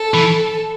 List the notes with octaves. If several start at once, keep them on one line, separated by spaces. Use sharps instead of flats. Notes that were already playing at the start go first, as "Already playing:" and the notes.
Already playing: A4
E3